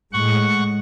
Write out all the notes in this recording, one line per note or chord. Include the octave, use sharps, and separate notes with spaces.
A2 G#3 F#5 C#6